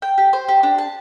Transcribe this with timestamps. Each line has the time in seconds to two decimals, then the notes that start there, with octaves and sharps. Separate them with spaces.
0.02 G5
0.18 G4
0.33 C5
0.48 G4
0.63 D4
0.78 A5